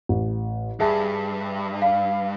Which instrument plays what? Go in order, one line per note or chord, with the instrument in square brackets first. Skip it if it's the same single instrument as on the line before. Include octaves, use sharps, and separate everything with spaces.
[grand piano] A1
[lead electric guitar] G2 [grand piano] G#4 E5 A5
[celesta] F5